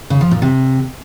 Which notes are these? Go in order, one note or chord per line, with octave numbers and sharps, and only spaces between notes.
C#3
F3
A#2
C3